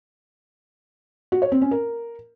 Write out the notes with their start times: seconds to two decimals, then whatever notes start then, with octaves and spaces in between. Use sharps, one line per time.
1.32 F#4
1.42 C#5
1.52 C4
1.62 C#4
1.71 A#4